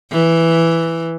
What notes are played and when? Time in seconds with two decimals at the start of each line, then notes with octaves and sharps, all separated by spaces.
0.12 E3